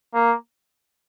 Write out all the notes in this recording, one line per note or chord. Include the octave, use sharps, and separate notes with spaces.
A#3